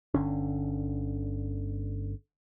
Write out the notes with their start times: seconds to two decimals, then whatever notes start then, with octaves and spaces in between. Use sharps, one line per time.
0.14 G1 D3 C#4